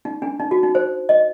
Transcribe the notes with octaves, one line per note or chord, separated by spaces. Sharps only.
D#4
D4
D#4
F#4
D#4
C5
D#5